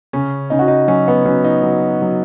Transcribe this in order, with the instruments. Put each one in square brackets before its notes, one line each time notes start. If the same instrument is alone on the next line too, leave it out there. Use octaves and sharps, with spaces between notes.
[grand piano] C#3 C#4
C#3 D#4
F#4
D#4
F#3 C#4
B3
F#3 C#4
D#4
F#3
F#3